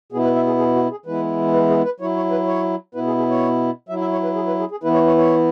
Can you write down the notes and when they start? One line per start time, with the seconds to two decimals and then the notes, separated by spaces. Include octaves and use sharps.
0.12 B2 B3 E4 G#4
0.24 B4
0.35 E5
0.47 G#4
0.59 G#4
0.76 F#4
0.91 G#4
1.06 E3 G#3 B3 E4 B4
1.54 B4
1.70 G#4
1.85 B4
2.00 F#3 E4 C#5
2.16 C#5
2.31 B4
2.47 C#5
2.95 B2 B3 E4 B4
3.07 G#4
3.18 G#4
3.30 C#5
3.89 F#3 E5
3.93 E4
4.01 E5
4.12 C#5
4.23 B4
4.35 G#4
4.47 B4
4.60 G#4
4.71 G#4
4.84 E3 B3 E4 B4
4.94 C#5
5.07 C#5
5.18 C#5